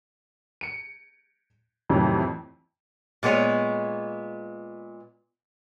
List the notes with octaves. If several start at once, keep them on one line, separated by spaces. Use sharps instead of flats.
C#7 D7
F2 A2 C3 D#3 E3 F#3
A#2 G#3 B3 C#5